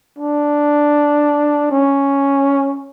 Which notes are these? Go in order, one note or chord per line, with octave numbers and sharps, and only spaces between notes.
D4
C#4